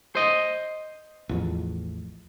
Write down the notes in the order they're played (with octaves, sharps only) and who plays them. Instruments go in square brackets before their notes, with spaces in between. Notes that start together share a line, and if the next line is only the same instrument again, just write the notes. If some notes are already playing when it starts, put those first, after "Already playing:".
[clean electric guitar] C5 D#5
[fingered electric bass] A1 E2 F3